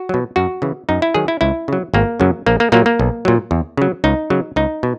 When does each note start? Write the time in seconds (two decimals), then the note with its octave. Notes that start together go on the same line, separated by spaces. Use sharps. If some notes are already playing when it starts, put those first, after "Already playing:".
Already playing: F#4
0.09 B2 F#3
0.36 F#2 F#4
0.62 C#3 E3
0.89 F#2 D#4
1.02 E4
1.14 D#3 F#3 G#4
1.28 E4
1.41 C#2 E4
1.68 C#3 F#3
1.94 G#1 A#3
2.20 F#2 C#3 F#3
2.46 A#1 A#3
2.60 A#3
2.72 A#2 F#3 A#3
2.86 A#3
3.00 B1
3.25 A#2 F#3
3.51 E2
3.77 C#3 F#3
4.04 C#2 D#4
4.30 C#3 F#3
4.56 C#2 D#4
4.83 B2